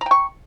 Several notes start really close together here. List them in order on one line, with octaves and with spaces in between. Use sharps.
A#5 G5 C#6